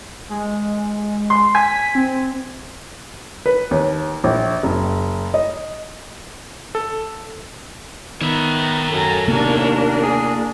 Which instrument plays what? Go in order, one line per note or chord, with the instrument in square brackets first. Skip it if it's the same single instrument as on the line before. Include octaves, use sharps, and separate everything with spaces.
[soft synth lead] G#3
[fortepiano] C6
[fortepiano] G#5 [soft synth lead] B6
[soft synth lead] C4
[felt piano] B4
D#2
A#1
F#1
D#5
[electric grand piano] A4
[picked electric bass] D#3 [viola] B3 A#5 [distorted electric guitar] C#5 E5
[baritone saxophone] F#2 [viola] A4 A#5
[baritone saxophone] D#2 [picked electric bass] C3 A#3 B3 [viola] D4 A#4
[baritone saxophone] G#4